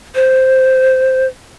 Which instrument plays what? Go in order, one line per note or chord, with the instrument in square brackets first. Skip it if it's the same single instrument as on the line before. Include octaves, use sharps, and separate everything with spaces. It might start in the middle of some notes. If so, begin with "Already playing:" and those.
[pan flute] C5